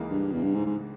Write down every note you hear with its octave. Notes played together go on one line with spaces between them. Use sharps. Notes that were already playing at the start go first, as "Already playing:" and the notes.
Already playing: C#2 C#3 E3 A#3 D#4
G2
E2
G2
G#2
G#2